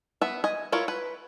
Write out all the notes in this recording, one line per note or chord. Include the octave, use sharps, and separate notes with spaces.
B3 E5
D#5 G#5
E4 F4 A#4 C#5
B4